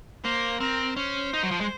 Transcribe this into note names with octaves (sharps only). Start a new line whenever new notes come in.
A#3 C5
C4 A#4
C#4 C5
D#4
F#3
F3
G#3